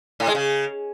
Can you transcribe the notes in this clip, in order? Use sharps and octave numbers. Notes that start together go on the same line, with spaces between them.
A2
G#3
C#3